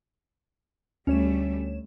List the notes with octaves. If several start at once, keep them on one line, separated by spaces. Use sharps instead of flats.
D2 G3 A3 C#4 C#5 E7